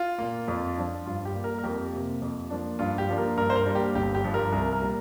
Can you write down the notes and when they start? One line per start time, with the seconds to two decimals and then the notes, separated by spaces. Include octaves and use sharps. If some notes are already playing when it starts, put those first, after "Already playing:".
Already playing: F4
0.18 A#2 A#3
0.48 F2
0.77 F3 D4
1.06 G2 F4
1.25 G4
1.35 G3 A#3
1.44 A#4
1.59 A#4
1.64 F2 G4
1.93 C3 A#3
2.22 F2
2.50 F3 A#3 D4
2.79 G2 F4
2.98 G4
3.09 F3 A#3 D4
3.18 A#4
3.37 G2 A#4
3.50 C5
3.56 A#4
3.66 G3 A#3 D4
3.75 G4
3.95 G1 G4
4.15 G4
4.24 G2 F3
4.34 A#4
4.52 C2 A#4
4.72 A#4
4.82 A#2 G3